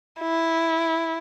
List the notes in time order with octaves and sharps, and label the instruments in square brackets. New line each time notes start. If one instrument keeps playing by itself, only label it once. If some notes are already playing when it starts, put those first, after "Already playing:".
[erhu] E4